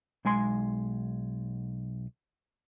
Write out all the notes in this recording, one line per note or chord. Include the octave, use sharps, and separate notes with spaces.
B1 G#3 G#5 C6